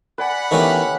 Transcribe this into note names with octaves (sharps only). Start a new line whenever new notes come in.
B4 D5 F#5 G#5 B5
D#3 E3 A3 B3 C#4 G4